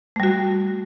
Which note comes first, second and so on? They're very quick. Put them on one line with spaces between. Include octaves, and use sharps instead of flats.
A3 G3 F#4